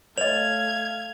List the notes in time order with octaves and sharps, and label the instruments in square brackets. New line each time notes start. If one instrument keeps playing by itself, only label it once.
[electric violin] A3 F5 [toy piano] C#5 D#5 [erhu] G#6 [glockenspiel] F7